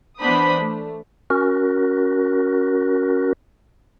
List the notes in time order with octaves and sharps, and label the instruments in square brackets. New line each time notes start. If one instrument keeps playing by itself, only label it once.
[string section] E3 B3 D4 C5 B5 D#6
A3
[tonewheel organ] C#4 F#4 A#4